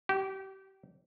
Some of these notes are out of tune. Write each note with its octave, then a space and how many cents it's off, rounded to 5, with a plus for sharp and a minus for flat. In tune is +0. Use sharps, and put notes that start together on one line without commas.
G4 -30